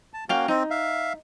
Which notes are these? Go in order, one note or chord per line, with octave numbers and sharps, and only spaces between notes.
A5
A#3 C#4 F#4 F5 G5
C4 D#4
E5 F5